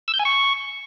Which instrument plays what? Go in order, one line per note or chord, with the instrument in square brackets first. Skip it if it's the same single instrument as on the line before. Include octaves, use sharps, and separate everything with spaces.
[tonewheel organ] E6
G6
G#5
C#6